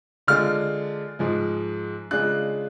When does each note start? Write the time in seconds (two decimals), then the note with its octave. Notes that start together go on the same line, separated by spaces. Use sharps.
0.28 D3 G#3 D4 F4 F6
1.19 G#2 F3 G#3
2.11 C#3 G#3 D4 F4 F#6